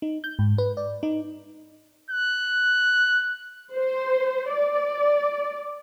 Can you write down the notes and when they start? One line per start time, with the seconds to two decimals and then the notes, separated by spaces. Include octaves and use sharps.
0.02 D#4
0.24 G6
0.39 G#2
0.58 B4
0.77 D5
1.03 D#4
2.10 F#6
3.74 C5
4.52 D5